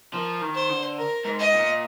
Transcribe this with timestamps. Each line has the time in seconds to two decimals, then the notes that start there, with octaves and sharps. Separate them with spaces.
0.13 F3 A#4
0.41 D#3
0.55 C5
0.69 D3
0.97 A#4
1.25 G#2
1.39 D#5
1.53 A#2